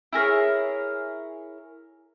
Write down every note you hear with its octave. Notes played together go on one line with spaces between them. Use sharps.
E4 G#4 A#4 C#5